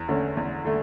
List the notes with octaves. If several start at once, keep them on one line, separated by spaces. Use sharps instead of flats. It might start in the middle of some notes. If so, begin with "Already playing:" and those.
Already playing: E2
D3 A3 C#4
E2
D3 A3